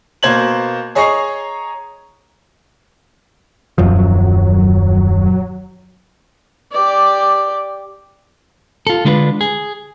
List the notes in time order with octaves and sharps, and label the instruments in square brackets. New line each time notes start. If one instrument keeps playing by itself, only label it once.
[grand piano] B2 A#3 C5 G#6 F#7
G#4 C#5 D#5 A#5 C#6 C7
[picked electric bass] D#1 F#2 F3 [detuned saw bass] F#3
[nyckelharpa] G4 D5
[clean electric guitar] F4 A4
D3 G#3 D4 F4 G#4 B4
G#4